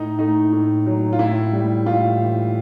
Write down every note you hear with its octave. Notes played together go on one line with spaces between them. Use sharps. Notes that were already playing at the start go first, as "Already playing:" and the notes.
Already playing: A2 D#4
A3 D#4
A2
F#3
F4
A2 E4
G3
A2 F4
E3